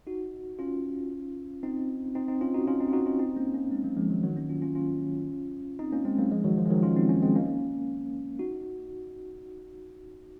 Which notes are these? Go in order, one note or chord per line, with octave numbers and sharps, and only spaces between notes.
D#4 F#4
C#4 F4
C4 D#4
C4 D#4
C4 D#4
C#4 F4
D#4 F#4
C#4 F4
C4 D#4
F4
D#4 F#4
C#4 F4
C4 D#4
A#3 C#4
A#3 C#4
G#3 C4
F#3 A#3
F3 G#3
D#3 F#3
D#3 F#3
A#3 C#4
C#4 F4
C#4 F4
C#4 F4
C4 D#4
A#3 C#4
G#3 C4
F#3 A#3
F3 G#3
D#3 F#3
F3
G#3
D#3 F#3
C#4 F4
C4 D#4
A#3 C#4
G#3 C4
A#3 C#4
D#4 F#4